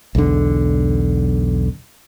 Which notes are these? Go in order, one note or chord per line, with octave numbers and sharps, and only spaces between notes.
B1 E2 D3